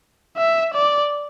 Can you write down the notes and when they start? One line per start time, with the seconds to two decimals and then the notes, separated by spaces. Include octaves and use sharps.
0.37 E5
0.74 D5